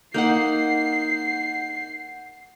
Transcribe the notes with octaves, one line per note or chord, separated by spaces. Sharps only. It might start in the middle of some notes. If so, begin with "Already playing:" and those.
A#3 D#4 F#5 G6 C7